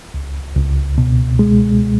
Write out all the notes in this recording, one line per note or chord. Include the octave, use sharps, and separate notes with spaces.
C#2
C#2
B2
G#3